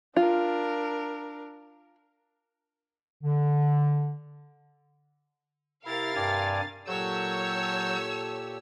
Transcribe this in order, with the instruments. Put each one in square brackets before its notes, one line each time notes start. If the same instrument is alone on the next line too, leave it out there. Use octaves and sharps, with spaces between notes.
[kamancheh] D4 A#4 [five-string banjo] F4
[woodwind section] D3
[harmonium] C3 G4 [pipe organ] E4 [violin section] A#4 F5 A6
[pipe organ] G2 D5 G#5
[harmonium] A#2 G4 A4 [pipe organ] F#3 G6 [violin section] C#5 E6